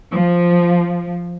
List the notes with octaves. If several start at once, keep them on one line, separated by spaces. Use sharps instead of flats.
F3